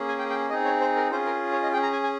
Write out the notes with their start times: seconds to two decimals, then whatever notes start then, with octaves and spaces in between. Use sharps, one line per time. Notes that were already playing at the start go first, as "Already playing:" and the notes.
Already playing: A#3 C#4 G#4
0.09 G#5
0.19 G5
0.30 G5
0.50 C4 D#4 G#4 D#5
0.65 C#5
0.81 C5
0.96 A#4
1.11 C#4 F4 G#4 C5
1.26 A#4
1.52 C#5
1.63 D#5
1.72 G#4 G5
1.76 C#4
1.83 A#5
1.93 G#5
2.03 G#5